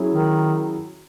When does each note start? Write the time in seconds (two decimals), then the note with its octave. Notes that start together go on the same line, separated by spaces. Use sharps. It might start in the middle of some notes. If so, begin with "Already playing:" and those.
Already playing: F#3 C#4 E4 G#4
0.15 D#3